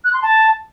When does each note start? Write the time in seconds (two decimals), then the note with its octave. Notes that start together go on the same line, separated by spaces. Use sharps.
0.04 F#6
0.13 C6
0.22 A5